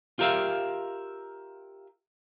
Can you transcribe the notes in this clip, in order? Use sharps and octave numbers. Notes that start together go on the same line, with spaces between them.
F4 G4 A#4 E5 F5